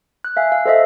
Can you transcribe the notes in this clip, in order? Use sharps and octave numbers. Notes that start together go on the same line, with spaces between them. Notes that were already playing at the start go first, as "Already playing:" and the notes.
F#6
E5 F5 G#5
F5
A4 C5 D#5 E5